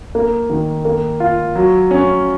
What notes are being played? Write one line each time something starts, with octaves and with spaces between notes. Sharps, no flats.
A#3
D#3
A#3
F4
F#3
C#4